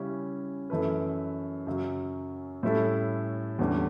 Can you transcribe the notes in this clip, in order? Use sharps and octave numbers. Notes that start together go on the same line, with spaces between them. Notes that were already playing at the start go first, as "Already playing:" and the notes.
Already playing: C#3 G3 C#4 E4
F#2 E3 A3 E4 B4
F#2 C#3 F#3 C#4
A2 G3 C#4 E4 A4
E2 D3 G3 C#4 G4